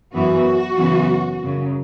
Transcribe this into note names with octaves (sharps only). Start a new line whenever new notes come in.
F#2 E3 B3 F#4
F#2 C#3 E3 B3
F#2 C#3 F#3